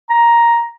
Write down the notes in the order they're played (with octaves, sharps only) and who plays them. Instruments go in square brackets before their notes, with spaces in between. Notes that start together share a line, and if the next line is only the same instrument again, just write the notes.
[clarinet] A#5